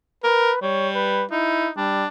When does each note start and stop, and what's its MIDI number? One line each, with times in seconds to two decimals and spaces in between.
0.24 0.51 70
0.24 0.62 71
0.62 1.25 55
0.62 0.89 73
0.95 1.24 71
1.31 1.71 63
1.31 1.68 64
1.77 2.04 55
1.77 2.08 62